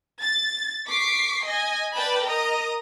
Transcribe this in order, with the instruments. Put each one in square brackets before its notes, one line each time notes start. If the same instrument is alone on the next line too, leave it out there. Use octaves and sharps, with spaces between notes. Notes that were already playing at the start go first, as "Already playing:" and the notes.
[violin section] A6
C#6 D6 B6 C7
D#5 G#5
B4 D5 G5 A5 B5
A#4 D#5 A#5 D#6